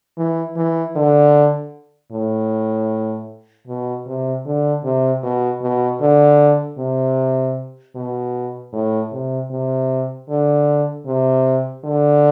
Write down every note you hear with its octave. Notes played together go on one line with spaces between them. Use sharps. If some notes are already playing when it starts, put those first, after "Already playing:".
E3
E3
D3
A2
B2
C3
D3
C3
B2
B2
D3
C3
B2
A2
C3
C3
D3
C3
D3